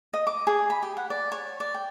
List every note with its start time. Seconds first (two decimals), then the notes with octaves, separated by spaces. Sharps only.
0.14 D#5
0.27 D6
0.47 G#4
0.70 B5
0.83 G4
0.97 F#5
1.10 D5
1.32 C#5
1.60 D5
1.74 G5